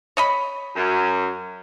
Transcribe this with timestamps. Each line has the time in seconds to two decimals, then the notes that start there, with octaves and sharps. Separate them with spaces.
0.17 C#5 D#5 B5
0.75 F#2